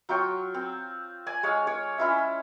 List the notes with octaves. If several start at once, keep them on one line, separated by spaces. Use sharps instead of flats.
F#3 F4 G5 C#6
C4
D5 G#5
G#3 C#5 F5
C#5 D6
C#4 E4 F4 E5